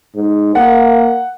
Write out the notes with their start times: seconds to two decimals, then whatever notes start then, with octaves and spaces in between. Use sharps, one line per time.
0.16 G#2
0.55 A#3 F#5